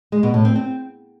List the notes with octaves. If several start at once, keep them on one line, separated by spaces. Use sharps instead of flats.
G#3
B2
A2
C4
C4